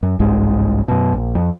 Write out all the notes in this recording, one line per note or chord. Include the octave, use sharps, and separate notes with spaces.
F#2
G1 C2 G#2 G#3
F#2 B2
A#1
F2